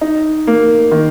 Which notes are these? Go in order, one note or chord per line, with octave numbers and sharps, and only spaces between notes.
D#4
A#3
D#3